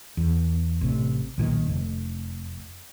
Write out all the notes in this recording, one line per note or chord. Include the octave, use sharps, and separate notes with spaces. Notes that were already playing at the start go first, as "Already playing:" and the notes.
E2
A1 C3
B1 A#2 D#3
F1